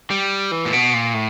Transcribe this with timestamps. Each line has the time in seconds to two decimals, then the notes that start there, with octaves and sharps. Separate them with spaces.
0.10 G3
0.51 E3
0.65 A#2
0.73 B2
0.93 A#2
1.14 A2